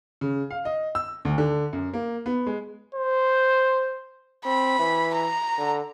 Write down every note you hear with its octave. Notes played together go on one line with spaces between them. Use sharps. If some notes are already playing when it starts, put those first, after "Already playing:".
C#3
F5
D#5
E6
D2
D3
F#2
A#3
B3
G#3
C5
C4 B5
E3
A#5
D3